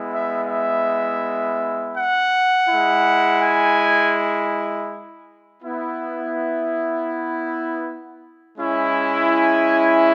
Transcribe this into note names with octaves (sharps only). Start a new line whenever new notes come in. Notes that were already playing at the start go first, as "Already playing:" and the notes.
Already playing: G#3 B3 E4
E5
E5
F#5
G#3 E4
G#5
B3 E4
G#3 C#4 E4
G#5